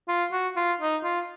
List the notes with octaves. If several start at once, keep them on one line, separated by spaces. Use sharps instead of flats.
F4
F#4
F4
D#4
F4